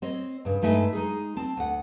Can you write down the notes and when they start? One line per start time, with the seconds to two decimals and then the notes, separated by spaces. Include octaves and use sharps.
0.02 C4 C#5 D#5
0.45 G2 C#3
0.62 G2 G#3 A3 D#4 E5 G#5
0.93 G#3 D#4 G#4
1.36 C4 A5
1.57 D2 F#5